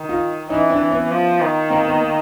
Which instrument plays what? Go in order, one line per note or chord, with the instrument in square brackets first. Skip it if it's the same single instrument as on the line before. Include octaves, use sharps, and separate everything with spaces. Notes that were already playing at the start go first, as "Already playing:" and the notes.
Already playing: [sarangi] D#3
[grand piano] D#4 F4
[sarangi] E3 [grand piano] C#4 D#4
[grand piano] C4 D4
[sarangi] E3
[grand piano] B3 C#4
[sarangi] F3
D#3
[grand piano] A#3 C4
B3
A#3